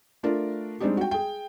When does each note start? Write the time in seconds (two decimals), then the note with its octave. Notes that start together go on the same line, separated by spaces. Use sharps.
0.23 A3 D4 F4 A#4
0.80 G3 G#3 C4 D4 D#4 G4
0.97 F#4 G5
1.11 G#4 G5